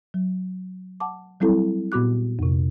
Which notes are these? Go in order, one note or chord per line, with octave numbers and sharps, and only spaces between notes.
F#3
F#5 A5 D6
F#3 G3 C4 E4 A4
A#2 B3 F#4 D6 F#6
F2 C3